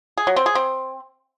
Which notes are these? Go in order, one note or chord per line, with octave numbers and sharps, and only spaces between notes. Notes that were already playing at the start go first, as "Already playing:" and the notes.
G#4
F#3
C4
G#4
C4